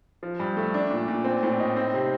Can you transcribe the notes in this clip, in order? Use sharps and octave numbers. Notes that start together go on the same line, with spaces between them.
F3
G2
A3
D4
A#2
A#2
C4
A2
D#4
C4
C3